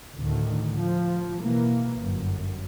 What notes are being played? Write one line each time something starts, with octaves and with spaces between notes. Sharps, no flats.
D2 A2 D3 D#3
F3
B2 E3 A#3
G1 F#2